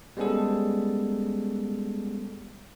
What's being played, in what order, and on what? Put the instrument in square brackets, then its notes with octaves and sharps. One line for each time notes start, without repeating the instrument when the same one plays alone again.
[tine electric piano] G3 G#3 B3 C#4 G#4 A4